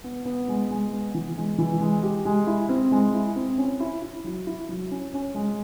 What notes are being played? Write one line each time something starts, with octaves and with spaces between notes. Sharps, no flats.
B3
B3
G#3
G#3
B3
E3
G#3
E3
G#3
G4
G#3
E4
C4
G#3
E4
C4
C#4
E4
E4
F#3
E4
F#3
C#4
C#4
G#3